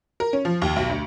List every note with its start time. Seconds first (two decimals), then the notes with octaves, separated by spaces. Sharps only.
0.20 A#4
0.33 C#4
0.45 F3
0.62 D#2
0.76 B1
0.90 D2